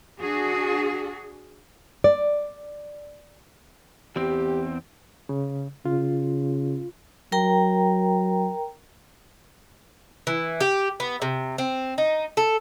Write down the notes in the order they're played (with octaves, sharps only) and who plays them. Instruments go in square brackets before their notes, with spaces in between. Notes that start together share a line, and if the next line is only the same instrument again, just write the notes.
[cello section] D4 F#4 G#4
[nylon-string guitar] D5
[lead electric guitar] E2 C4 [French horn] G4
[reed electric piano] C#3
[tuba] C#3 [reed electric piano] F4
[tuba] F#3 [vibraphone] A#4 G5 A#5
[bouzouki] E3
G4
B3
C3
C4
D#4
A4